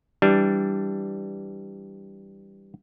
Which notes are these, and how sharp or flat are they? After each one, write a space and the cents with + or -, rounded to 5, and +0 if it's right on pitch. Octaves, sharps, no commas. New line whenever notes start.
E3 +0 G3 +0 D4 +0